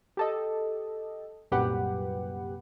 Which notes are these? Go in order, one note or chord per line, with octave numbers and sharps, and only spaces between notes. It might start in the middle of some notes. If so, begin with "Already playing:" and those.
G4 A4 D#5
C2 F#2 A#2 G4 B4 F#5